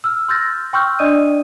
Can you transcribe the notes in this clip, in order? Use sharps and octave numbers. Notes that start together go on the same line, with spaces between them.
E6 F6
C6 E6 F6 G6 A6 A#6
G5 C6 C#6 E6 F6 G6
D4 D5 D#5 D#6 D#7